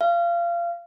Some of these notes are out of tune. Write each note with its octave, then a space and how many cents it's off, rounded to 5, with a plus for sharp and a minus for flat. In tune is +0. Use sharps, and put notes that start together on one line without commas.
F5 -25